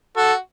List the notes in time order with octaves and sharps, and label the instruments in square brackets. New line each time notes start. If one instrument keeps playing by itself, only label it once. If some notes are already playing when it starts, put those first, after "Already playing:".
[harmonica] F#4 [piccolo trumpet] A4